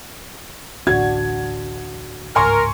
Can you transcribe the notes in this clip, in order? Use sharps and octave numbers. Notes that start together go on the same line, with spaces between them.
A1 D2 D4 F#4 G#6
G1 C#2 G#2 A#4 G#5 C6 C#6